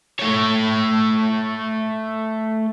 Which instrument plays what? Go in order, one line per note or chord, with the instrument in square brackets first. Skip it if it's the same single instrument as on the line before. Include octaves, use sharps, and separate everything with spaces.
[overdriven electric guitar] A3 C#5